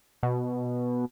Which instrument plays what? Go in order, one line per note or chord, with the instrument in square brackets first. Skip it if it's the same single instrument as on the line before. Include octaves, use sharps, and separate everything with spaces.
[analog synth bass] B2